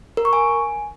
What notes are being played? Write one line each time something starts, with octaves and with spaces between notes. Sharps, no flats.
A#4
C#6
G#5